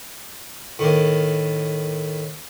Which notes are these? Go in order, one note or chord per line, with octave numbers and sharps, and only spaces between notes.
A2 D#3 A#3